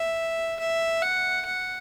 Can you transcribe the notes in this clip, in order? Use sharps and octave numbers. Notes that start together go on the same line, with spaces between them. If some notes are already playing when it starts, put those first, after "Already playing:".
Already playing: E5
E5
F#5
F#5